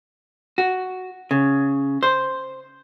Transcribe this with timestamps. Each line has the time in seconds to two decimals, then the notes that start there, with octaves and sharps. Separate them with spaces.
0.58 F#4
1.31 C#3
2.03 C5